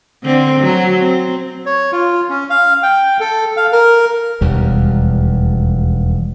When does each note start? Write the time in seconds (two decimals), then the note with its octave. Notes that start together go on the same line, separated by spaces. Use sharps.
0.24 D3 C4
0.60 F#3
0.99 C4
1.66 C#5
1.92 F4
2.29 C#4
2.50 F5
2.83 G5
3.20 A4
3.57 F5
3.72 A#4
4.41 E1 D#2 G3